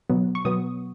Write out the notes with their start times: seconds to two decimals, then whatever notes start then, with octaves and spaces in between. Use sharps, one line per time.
0.09 B2 F#3 B3
0.35 C#6
0.45 B2 F#3 B3 D#6